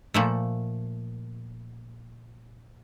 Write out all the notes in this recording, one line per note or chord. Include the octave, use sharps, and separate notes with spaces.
A#2 F3 A3